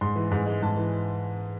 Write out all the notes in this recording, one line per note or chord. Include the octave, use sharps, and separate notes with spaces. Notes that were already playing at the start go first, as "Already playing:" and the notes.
G#2 C6
E3
G#2
G#3
G#2 A5
E3